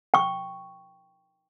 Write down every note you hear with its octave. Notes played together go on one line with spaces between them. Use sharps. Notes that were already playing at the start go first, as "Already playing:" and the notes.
G5 C#6